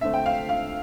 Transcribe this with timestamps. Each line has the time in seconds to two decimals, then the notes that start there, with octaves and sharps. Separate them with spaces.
0.01 D2 D3 A3 C4 E5
0.14 G5
0.26 F5
0.49 F5